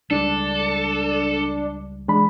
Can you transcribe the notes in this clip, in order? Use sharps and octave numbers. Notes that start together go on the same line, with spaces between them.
C#2 G3 G#3 D4 A4
E3 G#3 D4 B5